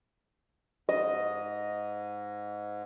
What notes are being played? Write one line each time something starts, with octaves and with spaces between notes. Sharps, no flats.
G#2 D#5